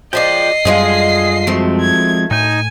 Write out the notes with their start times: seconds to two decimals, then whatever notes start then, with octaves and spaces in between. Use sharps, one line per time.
0.13 F3 G#3 D5 D#5 G5 C7
0.65 F#2 D3 G3 G#3 F4 G#4
1.47 D2 D#3 F3 G#3 A3 C4
1.80 G#6
2.31 A2 D#4 G#5 G6